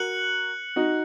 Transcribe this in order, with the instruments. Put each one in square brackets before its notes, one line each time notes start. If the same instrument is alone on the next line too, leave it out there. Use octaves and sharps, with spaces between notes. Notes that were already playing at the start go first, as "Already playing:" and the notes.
Already playing: [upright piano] F#4 A#4 [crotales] F#6 C#7 F#7
[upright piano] D#4 F#4